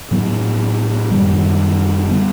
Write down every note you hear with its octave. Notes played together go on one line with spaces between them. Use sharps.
A2 F#3 B3
F#2 D#3 G3
D3 G3 B3